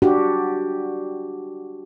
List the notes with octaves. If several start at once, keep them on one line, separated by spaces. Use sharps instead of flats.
D4 F#4 G4